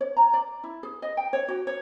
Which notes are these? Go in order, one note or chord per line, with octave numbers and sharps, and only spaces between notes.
C#5
A#5
D5
E4
G#4
D#5
G5
C#5
F#4
C#5